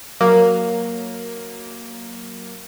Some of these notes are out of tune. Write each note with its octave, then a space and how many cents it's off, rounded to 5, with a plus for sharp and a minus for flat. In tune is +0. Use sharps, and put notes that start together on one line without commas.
F#3 +0 A#3 +0